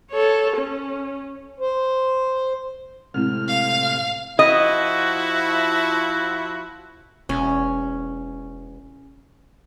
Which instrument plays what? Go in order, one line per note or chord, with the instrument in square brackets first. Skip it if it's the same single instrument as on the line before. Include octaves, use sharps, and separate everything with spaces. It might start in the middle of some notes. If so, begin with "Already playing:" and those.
[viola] A4 C#5
C#4
[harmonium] C5
[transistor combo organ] A2 C3 F6 [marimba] G#3 C4 E4
[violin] F5
[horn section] F3 E4 F#4 [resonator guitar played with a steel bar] D#5
[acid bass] E1 [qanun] C#4